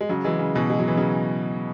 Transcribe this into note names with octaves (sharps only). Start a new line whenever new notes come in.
G#3
C#3 F#3
E3 G#3
C#3
B2 E3
G#3
F#3
E3
C#3 F#3